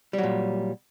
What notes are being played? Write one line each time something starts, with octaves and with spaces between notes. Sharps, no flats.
A#2 F#3 G3